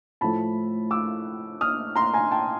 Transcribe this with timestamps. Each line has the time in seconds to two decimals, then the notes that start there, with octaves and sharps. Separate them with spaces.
0.21 A2 F3 A3 A5 B5
0.91 D6 E6
1.61 D#6 F6
1.96 A#5 C6
2.14 G#5 A#5
2.31 G5 A5